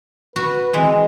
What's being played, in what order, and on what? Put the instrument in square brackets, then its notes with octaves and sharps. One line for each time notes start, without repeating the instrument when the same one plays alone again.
[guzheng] F#4 [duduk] B4
[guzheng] E3 G#3 [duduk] C4